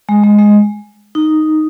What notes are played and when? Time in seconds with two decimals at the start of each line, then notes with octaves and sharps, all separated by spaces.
0.09 G#3
0.24 G#3
0.39 G#3
1.15 D#4